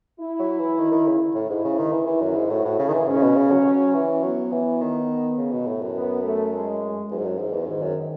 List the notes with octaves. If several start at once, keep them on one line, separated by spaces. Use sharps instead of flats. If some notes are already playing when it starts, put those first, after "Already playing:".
E4
F#3
E3
D#3
D#3
C#3
A2 E4
G#2
C#3
D#3
E3 E4
E3
F#2
G#2
A2 F#4
A2
C#3 G#4
D#3
E3
G#2 C#4
C#3
B2
C#3
F#3
F#3
E3
F#3 B3
E3
D#3
C#3
B2
A2
F#2
B3
A3
G#3
E2 F#3
G#2
F#2
G#2 E3
E2
G#2 D#3
F#2